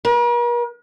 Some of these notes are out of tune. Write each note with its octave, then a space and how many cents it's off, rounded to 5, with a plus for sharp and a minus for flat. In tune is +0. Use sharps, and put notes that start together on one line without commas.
A#4 +45